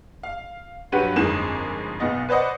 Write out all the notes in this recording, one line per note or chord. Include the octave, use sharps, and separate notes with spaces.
F5
G2 F#3 F#4 G4 B4 D#7
G1 F2 G#3 A#3 D#4 E7
B1 B3 D#5 A6
B4 C5 D5 D#5 F#5